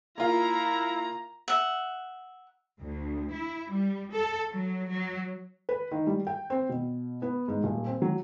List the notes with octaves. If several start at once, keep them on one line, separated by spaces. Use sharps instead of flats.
A#3 E4 F4 A#5
E5 F#5
D2
E4
G3
A4
F#3
F#3
B4
D#3
G3
G5
C4
B2
B3
G#2
D#1
C4
F#3